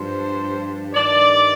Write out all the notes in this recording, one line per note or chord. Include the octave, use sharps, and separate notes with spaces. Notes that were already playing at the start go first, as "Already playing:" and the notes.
Already playing: G2 F3 C5
G2 D#3 D5